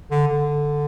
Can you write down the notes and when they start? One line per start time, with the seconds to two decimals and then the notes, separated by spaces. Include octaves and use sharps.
0.11 D3
0.28 D3